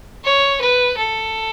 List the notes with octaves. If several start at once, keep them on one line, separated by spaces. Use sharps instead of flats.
C#5
B4
A4